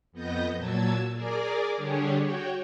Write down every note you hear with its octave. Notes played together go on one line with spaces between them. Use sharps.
F2 B3 D#5 G6 A#6
A#2 F#3 A5 E6 G#6
G#4 A#4 D5 D6
D3 G3 D4 G4 G#4 C#5
F#4 C#5 G5